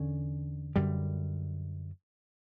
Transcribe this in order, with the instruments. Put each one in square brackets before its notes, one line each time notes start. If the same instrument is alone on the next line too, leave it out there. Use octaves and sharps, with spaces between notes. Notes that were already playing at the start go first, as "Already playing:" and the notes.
Already playing: [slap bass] E2 D3 C#4
F#2 D3 G3